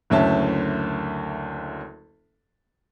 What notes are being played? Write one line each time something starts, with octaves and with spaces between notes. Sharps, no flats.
F#1 D2 C#4 E5 A5